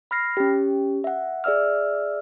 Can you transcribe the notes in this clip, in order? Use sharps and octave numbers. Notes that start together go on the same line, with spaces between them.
B5 F6 A#6 C7
C#4 G4
E5 F#5
G#4 D5 E5 E6 F6